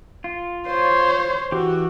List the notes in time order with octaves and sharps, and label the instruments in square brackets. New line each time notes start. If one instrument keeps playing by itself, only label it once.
[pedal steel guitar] F4
[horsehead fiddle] C5 C#5
[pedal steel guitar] E3 G4 [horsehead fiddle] F#4